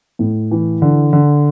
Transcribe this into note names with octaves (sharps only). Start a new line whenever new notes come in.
A2
E3
D3
D3